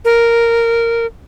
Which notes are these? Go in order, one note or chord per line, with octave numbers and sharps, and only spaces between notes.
A#4